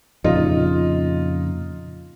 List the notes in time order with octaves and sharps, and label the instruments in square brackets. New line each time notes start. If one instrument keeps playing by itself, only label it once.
[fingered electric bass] F2 A#2 C#3 [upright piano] D#4 F4 D#5